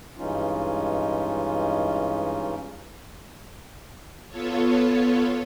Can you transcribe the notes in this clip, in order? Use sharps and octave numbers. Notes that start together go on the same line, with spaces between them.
G2 E3 G#3 C#4 D#4 F4
B3 F4 A4 C#5